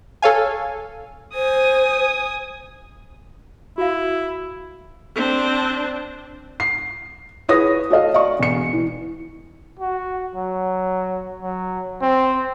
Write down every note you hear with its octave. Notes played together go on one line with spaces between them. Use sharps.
A4 C#5 F5 G#5
C5 G#5 D#6
E4 F#4 F5
C4 D4
C7
E4 G#4 B4 C#5 D#6 A#6
F#4 A4 C#5 D#5 F5
D5 D#5 F5 C#6
E1 C#7
E3
F#4
F#3
F#3
C4